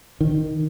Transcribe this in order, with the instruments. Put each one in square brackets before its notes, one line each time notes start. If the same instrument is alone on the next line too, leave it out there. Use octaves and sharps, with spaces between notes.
[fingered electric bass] D#3